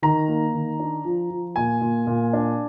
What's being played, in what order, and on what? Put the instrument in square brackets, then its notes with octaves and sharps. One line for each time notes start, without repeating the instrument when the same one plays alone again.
[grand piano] D#3 A#5
A#3
D#3
D4
F3
F3
A#2 G#5
A#2
A#2
D4